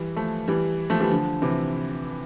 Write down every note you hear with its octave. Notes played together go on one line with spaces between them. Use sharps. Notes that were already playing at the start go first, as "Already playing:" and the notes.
Already playing: E3 G3
F3 A3
E3 G3
F3 A3
E3 G3
D3 F3
C3 E3